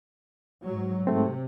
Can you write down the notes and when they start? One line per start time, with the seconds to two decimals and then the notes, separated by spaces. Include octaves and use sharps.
0.63 G#2 F#3
1.07 G#2 C3 A3 C4